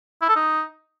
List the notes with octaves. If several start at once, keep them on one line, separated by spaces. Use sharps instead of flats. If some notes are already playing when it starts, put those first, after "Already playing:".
E4
A4
D#4